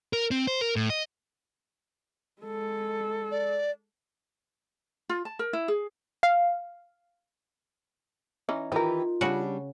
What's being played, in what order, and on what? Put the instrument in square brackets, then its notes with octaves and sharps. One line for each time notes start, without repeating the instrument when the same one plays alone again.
[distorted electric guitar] A#4
C4
C5
A#4
A2
D#5
[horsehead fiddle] G#3 A4
[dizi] D5
[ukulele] F4
A5
A#4
E4
G#4
[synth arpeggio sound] F5
[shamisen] E3 C#4 D#4
[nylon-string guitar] D#3 E3 G4 [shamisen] D#4 A#4 [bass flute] F4
[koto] C#3 F#4 [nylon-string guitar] G3 C#4 D4